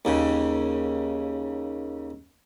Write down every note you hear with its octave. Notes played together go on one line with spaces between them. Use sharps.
D#2 C#3